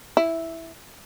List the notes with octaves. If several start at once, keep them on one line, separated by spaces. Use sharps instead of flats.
E4